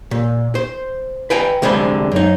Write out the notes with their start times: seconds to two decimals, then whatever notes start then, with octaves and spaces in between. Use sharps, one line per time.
0.11 A#2
0.55 C5
1.30 B4 G5 G#5 A#5
1.62 C2 D3 G#3 C5 B5
2.12 F#2 D#4